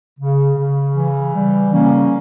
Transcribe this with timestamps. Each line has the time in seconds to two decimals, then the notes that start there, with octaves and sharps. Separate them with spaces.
0.19 C#3
0.58 C#3
0.96 E3
1.35 G3
1.73 C#3 A#3 C#4